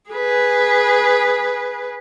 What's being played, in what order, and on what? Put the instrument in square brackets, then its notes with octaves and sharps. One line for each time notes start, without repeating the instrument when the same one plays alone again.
[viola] G#4 B4